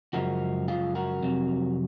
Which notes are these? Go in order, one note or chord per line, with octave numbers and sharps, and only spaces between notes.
F#2 C#3 F3 G#3 F#4 A#4
F4 G#4
F#4 A#4
F2 C3 F#3